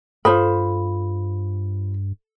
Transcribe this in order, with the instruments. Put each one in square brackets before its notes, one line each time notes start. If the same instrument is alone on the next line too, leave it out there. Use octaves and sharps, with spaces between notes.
[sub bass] G2 [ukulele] F4 C5 B5 [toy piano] A4